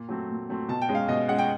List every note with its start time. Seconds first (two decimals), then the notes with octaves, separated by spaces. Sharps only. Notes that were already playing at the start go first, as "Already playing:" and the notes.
Already playing: A#2
0.09 F#3 A3 C4
0.29 A#2
0.49 F#3 A3 C4
0.68 B2 A5
0.82 G5
0.89 G#3 C#4
0.95 F5
1.08 B2 D#5
1.28 G#3 C#4 F#5
1.39 G5